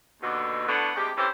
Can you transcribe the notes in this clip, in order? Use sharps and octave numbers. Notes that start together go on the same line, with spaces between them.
D#2 B2 D3
A2 D3 B3 D4 F#4 F#5
D2 C3 G#3 G4
C3 E3 C#4 G4 A4 C5